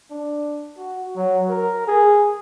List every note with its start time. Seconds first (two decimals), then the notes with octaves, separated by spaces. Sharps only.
0.11 D4
0.78 F#4
1.16 F#3
1.49 A#4
1.88 G#4